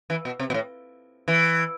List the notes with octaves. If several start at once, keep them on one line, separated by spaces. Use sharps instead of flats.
E3
B2
C3
B2
A2
E3